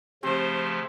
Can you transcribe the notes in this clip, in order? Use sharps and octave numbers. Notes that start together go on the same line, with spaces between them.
C#3 F3 A3 C4 G4 C5